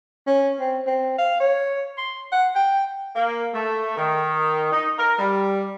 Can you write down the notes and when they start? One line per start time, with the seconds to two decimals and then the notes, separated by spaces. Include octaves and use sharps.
0.27 C#4
0.60 C4
0.87 C4
1.18 F5
1.40 C#5
1.98 C6
2.32 F#5
2.56 G5
3.16 A#3
3.54 A3
3.97 D#3
4.72 D#4
4.98 A#4
5.19 G3